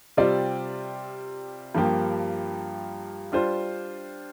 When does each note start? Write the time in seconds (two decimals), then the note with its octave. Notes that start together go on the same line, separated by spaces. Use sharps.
0.17 C3 G3 C4 F4 D5
1.75 G2 F3 A#3 G4
3.32 G3 D4 F4 C5